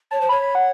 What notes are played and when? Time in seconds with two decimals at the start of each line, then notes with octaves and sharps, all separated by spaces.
0.11 C#5 A5
0.21 C5
0.29 C#5 B5
0.42 B5
0.55 F#5